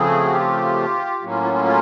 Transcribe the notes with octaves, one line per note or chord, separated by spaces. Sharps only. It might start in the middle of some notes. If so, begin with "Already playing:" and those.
Already playing: C#3 F3 A3 C4 G#4
F#4
F4 G4
A2 F#3 A#3 C#4
F4
F4
F4
F4